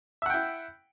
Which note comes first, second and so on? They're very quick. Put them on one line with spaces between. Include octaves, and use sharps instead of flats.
E5 F#5 G5 E4